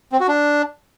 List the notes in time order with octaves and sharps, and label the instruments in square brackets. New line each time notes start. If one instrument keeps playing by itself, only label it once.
[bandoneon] C4
F#4
D4